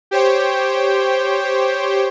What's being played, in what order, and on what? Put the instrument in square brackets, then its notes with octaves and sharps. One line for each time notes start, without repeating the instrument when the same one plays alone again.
[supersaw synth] G4 C5 C#5 G5